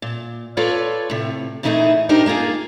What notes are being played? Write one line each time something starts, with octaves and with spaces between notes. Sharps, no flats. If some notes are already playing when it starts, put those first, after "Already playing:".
A#2
F4 A4 B4 C#5 D5
A2 C3
A#2 E3 A3 D#4 E4 G#4
D4 D#4 G4 A#4 C5
G#3 A#3 B3 F4 G#4